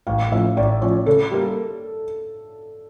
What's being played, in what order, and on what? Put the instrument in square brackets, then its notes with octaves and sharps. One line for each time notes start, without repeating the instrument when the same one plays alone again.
[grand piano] A1 [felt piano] F5
[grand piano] A2 F3 C#4 [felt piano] E5
[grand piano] A1 [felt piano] D5
[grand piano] A2 F3 C#4 [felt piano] C#5
[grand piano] C#3 [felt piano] A4
[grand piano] G3 A#3